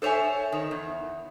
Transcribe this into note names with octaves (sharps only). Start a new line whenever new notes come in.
A4 C5 C#5 E5 G#5
D#3
E2